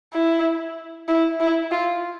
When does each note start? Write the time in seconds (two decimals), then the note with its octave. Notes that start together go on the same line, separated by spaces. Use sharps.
0.14 E4
1.08 E4
1.40 E4
1.71 F4